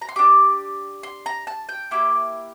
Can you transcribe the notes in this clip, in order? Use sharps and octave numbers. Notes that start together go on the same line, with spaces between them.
A#5
C6
D4 G4 D6
C6
A#5
A5
G5
A#3 E4 G4 D6